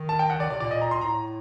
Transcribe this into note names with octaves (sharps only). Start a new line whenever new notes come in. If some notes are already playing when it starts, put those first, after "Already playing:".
Already playing: D#3
A5
G5
F#5
D#3 D5
C3 D5
A#2 D5
A#2 D#5
A#5
C6
A2 A#5